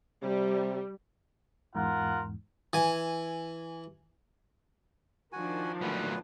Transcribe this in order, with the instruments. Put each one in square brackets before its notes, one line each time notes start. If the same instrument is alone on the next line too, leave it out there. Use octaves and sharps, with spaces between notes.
[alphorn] C3 [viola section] G3
[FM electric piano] E2 G#2 [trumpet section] F4 A#4 F#5
[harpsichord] E3 G#5
[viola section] D#3 F3 D4 [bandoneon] F#4 G#5
[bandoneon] A#2 B3 B4 [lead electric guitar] F#3 A3